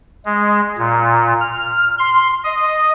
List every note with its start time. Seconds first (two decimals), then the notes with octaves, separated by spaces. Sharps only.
0.25 G#3
0.78 A#2
1.41 F6
1.99 C6
2.44 D#5